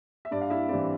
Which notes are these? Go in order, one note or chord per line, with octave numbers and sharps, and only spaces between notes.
E5
G2 D5
F5
E4 E5
E3 G3 C4 D5